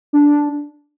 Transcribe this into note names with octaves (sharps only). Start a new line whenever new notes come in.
D4